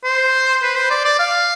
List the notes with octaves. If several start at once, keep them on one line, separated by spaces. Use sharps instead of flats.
C5
B4
C5
D5
D5
F5